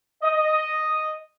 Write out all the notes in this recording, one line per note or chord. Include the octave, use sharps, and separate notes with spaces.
D#5